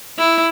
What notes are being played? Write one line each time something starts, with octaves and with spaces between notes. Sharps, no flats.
E4